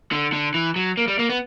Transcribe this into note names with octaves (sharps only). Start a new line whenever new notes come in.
D3
D3
E3
F#3
A#3
G3
A#3
B3